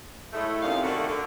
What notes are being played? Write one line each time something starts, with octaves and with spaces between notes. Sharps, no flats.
A2 G#3 A3
F2 C3 A#3 C#4 D#4 F5
D3 D#3 A3 F#4
D3